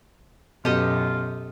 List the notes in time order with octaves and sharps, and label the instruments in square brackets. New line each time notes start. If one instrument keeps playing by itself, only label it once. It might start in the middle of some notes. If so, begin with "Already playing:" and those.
[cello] F#2 [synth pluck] B2 [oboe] F4 [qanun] G4 A4 D#5